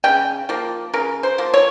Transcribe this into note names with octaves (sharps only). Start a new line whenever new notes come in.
C#3 G5
F3 A#3
C#3 A#4
C5
F3 A#3
C#5